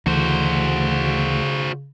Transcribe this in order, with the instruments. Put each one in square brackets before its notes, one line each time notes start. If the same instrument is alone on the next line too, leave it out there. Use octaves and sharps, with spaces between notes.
[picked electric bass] D2 [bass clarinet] C#3 [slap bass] E3 [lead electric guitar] F#4 C5